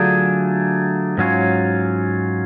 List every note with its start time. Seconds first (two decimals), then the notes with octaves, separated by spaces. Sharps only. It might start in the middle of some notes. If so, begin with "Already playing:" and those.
Already playing: D3 F#3 A3 D4 F4 G#4
1.18 G#2 F#3 C#4 F4